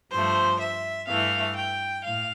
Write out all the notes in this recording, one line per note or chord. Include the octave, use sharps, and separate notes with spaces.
G2 F3 A3 C5
E5
G2 E3 A3 F5
G5
A2 F5